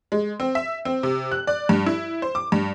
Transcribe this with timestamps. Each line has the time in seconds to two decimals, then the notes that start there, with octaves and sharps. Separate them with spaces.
0.12 G#3
0.40 C4
0.55 E5
0.85 C4
1.03 C3
1.31 F#6
1.47 D5
1.69 G2
1.86 E4
2.22 C5
2.35 D6
2.52 G2